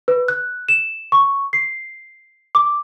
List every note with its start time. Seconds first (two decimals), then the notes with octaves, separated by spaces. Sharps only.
0.08 B4
0.28 F#6
0.69 E7
1.12 C#6
1.53 C7
2.55 D6